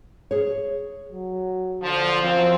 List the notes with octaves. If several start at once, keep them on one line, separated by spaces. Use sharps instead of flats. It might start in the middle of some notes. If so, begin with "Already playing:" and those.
G#4 C#5
F#3
D3 F3
F#2 F3 C4